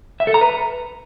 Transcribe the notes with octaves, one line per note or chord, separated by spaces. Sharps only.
E5
A4
A#5
B4